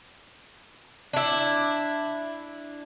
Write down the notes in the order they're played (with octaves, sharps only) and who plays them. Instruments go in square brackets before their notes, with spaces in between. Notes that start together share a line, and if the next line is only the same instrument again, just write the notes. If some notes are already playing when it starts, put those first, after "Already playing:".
[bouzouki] D4 E4